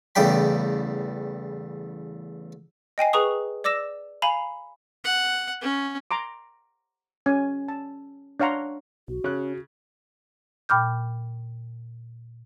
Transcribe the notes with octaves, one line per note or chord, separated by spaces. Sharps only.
A1 E2 C#3 G3 G5 B5
D#5 G5 G#5 C7
G#4 B4 A#5 C#6 D#6
D5 D6 E6 A#6 E7
F5 G#5 A#5 B5
F#5
C#4
A#5 C6 D6
C#4 G#5
A5
D4 C#5 F5 F#5 A#5 C6
B1 F#4
C#3 C#4 F#6
A#2 G5 B5 D6 F6 G6